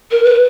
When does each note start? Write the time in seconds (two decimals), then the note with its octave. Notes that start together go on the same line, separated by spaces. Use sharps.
0.11 A#4
0.24 B4